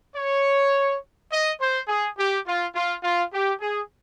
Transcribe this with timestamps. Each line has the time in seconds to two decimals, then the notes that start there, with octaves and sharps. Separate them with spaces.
0.16 C#5
1.31 D#5
1.60 C5
1.88 G#4
2.17 G4
2.45 F4
2.74 F4
3.03 F4
3.32 G4
3.61 G#4